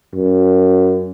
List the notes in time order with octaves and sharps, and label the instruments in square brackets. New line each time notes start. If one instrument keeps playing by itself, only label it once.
[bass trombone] F#2